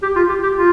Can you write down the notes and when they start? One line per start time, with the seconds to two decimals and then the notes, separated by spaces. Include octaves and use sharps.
0.02 G4
0.16 F4
0.29 G4
0.43 G4
0.57 F4